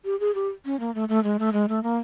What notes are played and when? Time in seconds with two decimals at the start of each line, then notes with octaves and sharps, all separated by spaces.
0.05 G4
0.20 G#4
0.35 G4
0.65 C#4
0.80 A#3
0.95 A3
1.09 A3
1.24 G#3
1.39 A3
1.53 G#3
1.69 A3
1.83 A#3